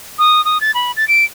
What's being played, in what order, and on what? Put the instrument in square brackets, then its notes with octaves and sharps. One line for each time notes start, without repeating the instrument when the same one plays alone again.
[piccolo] D#6
D#6
A6
B5
A6
D7